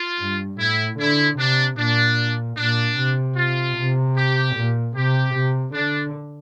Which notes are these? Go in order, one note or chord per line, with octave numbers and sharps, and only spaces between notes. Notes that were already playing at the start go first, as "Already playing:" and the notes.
Already playing: F4
G2
A2 E4
D3 E4
C3 D4
A#2 D4
A#2 D4
C3
F4
C3
G4
A#2
C3 G4
C3
D3 D4